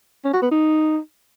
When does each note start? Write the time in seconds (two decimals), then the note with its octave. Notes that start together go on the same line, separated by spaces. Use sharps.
0.24 C#4
0.33 F#4
0.42 B3
0.51 D#4